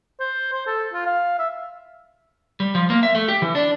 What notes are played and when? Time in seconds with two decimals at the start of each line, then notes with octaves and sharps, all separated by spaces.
0.20 C5
0.52 C5
0.67 A4
0.94 F4
1.06 F5
1.39 E5
2.60 G3
2.75 F3
2.90 A#3
3.03 E5
3.15 A3
3.28 G4
3.42 E3
3.55 D4